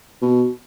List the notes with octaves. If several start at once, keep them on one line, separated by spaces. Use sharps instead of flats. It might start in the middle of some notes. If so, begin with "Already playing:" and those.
B2